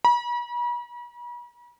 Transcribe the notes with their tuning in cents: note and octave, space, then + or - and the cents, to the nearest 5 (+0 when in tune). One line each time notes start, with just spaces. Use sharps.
B5 -45